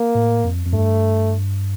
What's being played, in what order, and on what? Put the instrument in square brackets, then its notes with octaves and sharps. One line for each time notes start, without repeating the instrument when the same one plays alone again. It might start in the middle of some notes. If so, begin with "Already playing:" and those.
Already playing: [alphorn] A#3
[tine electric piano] A2
F2
F2
[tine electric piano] G2 [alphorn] A3